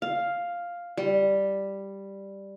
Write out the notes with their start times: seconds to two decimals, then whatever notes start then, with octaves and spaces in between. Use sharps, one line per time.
0.02 F5
0.97 G3